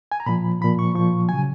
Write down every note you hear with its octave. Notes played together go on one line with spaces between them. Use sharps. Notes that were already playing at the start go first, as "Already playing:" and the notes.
G#5
A#5
A#2 F3 B5
A#2 F3 B5
C#6
A#2 F3 C#6
C#3 F#3 G#5